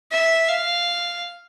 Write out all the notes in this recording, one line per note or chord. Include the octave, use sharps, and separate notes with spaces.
E5
F5